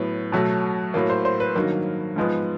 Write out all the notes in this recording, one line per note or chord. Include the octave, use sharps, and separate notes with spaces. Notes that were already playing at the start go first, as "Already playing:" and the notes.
Already playing: A2 F#3 B3
B2 F#3 A3
A2 F#3 A#3
C5
C5
B4
G2 D#3 F#3 A#3
G#2 F3 G#3 B3